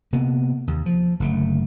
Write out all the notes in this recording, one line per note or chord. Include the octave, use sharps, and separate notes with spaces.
C3 A#3 B3
D#2
F3
F#1 D3 A3